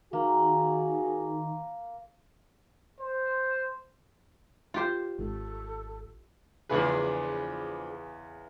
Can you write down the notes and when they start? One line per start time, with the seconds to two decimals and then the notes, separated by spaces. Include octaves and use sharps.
0.13 D#3 A#3 F#4 G#4
3.00 C5
4.74 F4 G4 C5
5.19 G#1 A4
6.69 E2 C#3 F3 D4 G#4 B4